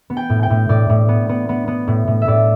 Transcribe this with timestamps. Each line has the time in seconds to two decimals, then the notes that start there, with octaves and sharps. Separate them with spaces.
0.10 B3
0.17 G5
0.30 A2
0.43 G5
0.50 A2
0.69 A2 D5
0.90 A2
1.09 B3
1.29 B3
1.49 B3
1.68 B3
1.88 A2
2.07 A2
2.22 E5
2.28 A2 D5